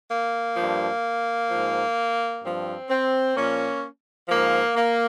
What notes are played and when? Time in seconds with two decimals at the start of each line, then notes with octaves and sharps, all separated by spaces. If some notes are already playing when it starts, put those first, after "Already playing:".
0.10 A#3
0.56 G2 F3
1.49 G#2 F3
2.42 G2 F3 C4
2.89 C4
3.35 A#2 F3 A#3 C#4
4.29 G#2 F3 A#3
4.76 A#3